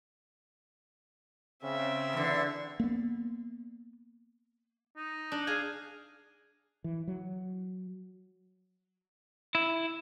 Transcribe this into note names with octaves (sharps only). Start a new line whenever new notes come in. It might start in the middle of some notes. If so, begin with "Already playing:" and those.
C#3 C4 E5
E2 D3
A#3 B3
D#4
D4
G#4 F5 G#5
E3
F#3
E4